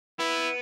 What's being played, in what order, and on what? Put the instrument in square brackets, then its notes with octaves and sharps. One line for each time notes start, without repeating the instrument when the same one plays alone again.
[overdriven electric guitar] B3 [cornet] E4